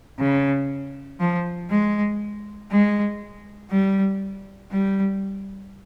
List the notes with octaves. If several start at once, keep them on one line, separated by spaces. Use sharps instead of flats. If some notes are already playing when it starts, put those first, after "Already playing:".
C#3
F3
G#3
G#3
G3
G3